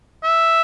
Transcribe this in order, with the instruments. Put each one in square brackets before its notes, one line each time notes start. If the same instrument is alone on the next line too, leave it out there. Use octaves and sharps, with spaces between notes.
[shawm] E5